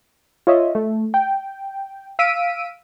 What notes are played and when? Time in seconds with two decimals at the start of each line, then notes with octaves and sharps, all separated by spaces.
0.47 F4 C#5 D#5 E5
0.75 A3
1.14 G5
2.19 F5 E6 B6 D7 D#7